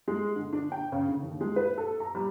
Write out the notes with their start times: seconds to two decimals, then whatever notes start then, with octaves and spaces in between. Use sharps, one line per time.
0.08 G#3
0.36 D3
0.53 D4
0.72 G5
0.92 C#3
1.08 D3
1.23 D#2
1.41 G#3
1.56 B4
1.78 A4
2.00 A#5
2.15 G3